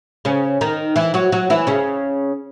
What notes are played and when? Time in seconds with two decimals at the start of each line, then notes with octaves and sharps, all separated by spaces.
0.25 C#3 C#4
0.61 D#3 D#4
0.96 E3 E4
1.14 F#3 F#4
1.32 F#3 F#4
1.50 E3 E4
1.67 C#3 C#4